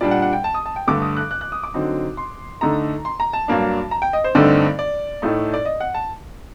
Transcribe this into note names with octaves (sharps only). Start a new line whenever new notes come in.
A#2 G3 D4 D5
F#5
F#5
G5
A5
D#6
A5
G5
G2 D3 A3 D6
D#6
F#6
F#6
F#6
D#6
D6
D3 F#3 C4 D#4
C6
D3 A3 D#4 A#5
C6
A#5
A5
G2 F#3 A#3 D4
A#5
G5
D#5
C5
G2 D3 A3 C4 D#4 D5
D5
A2 A3 D#4
D5
D#5
F#5
A5